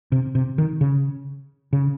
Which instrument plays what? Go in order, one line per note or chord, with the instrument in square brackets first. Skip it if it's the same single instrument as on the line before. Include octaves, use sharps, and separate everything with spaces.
[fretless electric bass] C3
C3
D#3
C#3
C#3